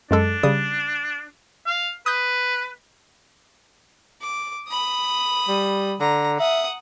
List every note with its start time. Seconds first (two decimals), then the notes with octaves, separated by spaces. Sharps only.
0.11 F#2 G#3 D4 A4
0.43 C#3 G3 D#6
1.66 F5
2.06 B4 D#6 G6
4.21 D6
4.68 B5 D#6
5.48 G3
6.00 D3 A#5
6.40 E5 F#5 D#6